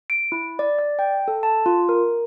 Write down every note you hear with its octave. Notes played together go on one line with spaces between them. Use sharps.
D7
E4
D5
D5
G5
A4
A5
F4
A#4